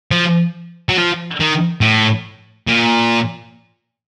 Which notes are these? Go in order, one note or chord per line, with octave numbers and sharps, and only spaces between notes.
F3
F#3
F3
D#3
A2
A#2